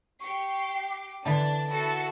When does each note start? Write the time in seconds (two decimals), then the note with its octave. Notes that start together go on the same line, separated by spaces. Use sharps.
0.20 G4 C#6 C7
0.89 D6
1.25 D3 E3 D4 A5
1.70 E4 F#4 A4